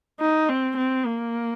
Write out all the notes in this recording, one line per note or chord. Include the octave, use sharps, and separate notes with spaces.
D#4
C4
C4
A#3